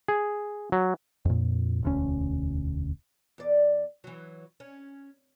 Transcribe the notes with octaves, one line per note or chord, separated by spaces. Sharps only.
G#4
F#3
F2 A#2
E1 D2 C#4
E2 D5
E3 F#3
C#4